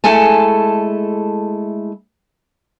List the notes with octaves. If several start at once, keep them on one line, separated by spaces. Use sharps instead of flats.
G#3 A3 E4 A4 G#5 A5